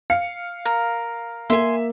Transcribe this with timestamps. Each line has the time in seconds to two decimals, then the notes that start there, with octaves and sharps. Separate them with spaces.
0.10 F5 C#7
0.65 A#4
1.50 A#3 A#4 E5 G#5 C6